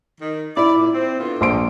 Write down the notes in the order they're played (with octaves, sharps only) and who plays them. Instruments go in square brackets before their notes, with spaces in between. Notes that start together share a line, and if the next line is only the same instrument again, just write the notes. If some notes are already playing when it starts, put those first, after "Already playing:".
[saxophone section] D#3
[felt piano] E4 [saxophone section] D5
[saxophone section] A#2
C4
D3 B3 F4
[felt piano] A#1 C6 D7